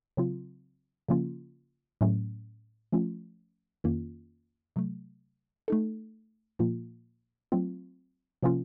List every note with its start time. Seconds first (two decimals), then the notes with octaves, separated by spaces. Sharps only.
0.17 C#3 F#3 C4 F4
1.08 C#3 F3 A#3 C#4 F4
2.01 A2 F#3 A3 C#4
2.92 F3 A3 C#4 F4
3.84 F2 D#3 A#3 C#4 F4
4.76 C3 F#3 A3
5.68 A3 D#4 A4
6.59 A#2 F3 A#3 F4
7.52 F#3 A3 C4 F4
8.43 C3 F3 A#3 C#4 F4